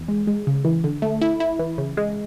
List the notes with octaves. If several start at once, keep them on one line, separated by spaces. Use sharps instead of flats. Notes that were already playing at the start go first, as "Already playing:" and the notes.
Already playing: E2
G#3
G#3
C#3
E3
D3
A3
E4
E4
E3
C#3
G#3